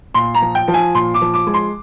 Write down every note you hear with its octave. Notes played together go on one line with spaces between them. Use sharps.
A#2 C6
A#5
F3
G5
F3
G#5
A#2 C6
D6
F3
D6
G#3
C6